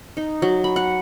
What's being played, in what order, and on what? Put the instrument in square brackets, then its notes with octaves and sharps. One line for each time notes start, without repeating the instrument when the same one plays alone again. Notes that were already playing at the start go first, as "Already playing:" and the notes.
[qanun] D#4
F#3
B5
F#5